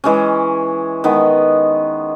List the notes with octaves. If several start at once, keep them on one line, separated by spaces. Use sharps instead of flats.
E3 G#3 C#4
D#3 G#3 B3